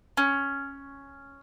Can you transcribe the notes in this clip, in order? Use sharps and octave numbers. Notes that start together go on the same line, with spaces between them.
C#4